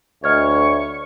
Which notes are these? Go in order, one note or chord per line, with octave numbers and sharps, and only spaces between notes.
D2 C#5 D#5 C#6 F6 G#6